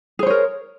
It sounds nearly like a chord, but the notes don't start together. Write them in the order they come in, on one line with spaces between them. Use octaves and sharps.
G#4 C5 C#5 A#4